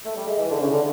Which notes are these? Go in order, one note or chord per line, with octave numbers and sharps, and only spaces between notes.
A3
G3
G#3
E3
D3
C#3
D3